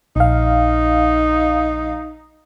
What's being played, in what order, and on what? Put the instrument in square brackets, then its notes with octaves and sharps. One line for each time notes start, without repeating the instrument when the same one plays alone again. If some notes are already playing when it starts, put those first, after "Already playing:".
[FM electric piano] A#1 F5 [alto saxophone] D#4